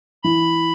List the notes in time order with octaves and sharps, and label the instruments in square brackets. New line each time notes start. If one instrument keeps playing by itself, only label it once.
[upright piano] E3 [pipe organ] B5